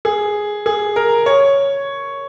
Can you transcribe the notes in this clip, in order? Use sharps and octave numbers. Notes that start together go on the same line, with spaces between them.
G#4
G#4
A#4
C#5